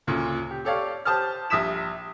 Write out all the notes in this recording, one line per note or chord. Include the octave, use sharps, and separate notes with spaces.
D2 A#2 C#3
G4
G4 A4 C#5 D5 F5
G4 C5 A5 D#6 F6
A#1 G3 E5 D#6 B6 E7